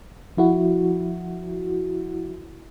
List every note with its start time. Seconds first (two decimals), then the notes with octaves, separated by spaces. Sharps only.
0.37 F3 E4 F#4